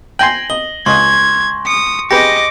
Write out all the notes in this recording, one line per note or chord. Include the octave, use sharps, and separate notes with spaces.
G5 G#5 C6 A#6 F#7
D#5 G7
C#2 D#5 C6 C#6 G#6
D#6 C#7
G4 G#4 B4 D#5 D6 A#6 C#7